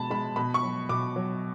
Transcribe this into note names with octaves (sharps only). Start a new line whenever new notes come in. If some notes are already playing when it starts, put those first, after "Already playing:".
Already playing: B2 G#3 A5 B5
G#3 B5
B2 B5
C#6
F#3
B2 D6
F#3